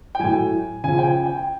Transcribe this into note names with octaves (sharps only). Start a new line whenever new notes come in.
G5
A2 F#3 G#5
C#3 F3 G#5
G5
G#5
G5